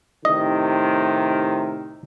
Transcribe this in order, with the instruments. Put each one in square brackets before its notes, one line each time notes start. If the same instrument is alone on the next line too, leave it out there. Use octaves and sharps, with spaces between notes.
[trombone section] A2 C3 D#3 [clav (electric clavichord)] D#5